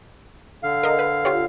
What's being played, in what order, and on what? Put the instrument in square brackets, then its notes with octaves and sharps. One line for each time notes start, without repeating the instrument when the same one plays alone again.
[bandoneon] D3 F5
[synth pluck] A#4 D#5
B4
F4 G4 C#5